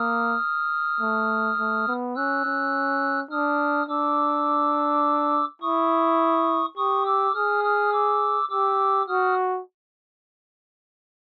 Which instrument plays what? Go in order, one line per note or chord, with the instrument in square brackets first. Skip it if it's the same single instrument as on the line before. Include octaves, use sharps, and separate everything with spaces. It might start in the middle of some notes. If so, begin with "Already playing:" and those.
Already playing: [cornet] A#3 [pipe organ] D#6 F6
[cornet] A3
A3
B3
[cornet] C#4 [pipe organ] E6 F#6
[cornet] C#4
[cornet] D4 [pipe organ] D#6 F6
[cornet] D4 [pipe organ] D6 E6
[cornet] E4 [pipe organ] C#6 D#6
[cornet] G4 [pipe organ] C#6 D#6
[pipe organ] D6 E6
[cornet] G#4 [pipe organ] D#6 F6
[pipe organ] D#6 F6
D6 E6
[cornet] G4 [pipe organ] D6 E6
[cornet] F#4 [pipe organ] D#6 F6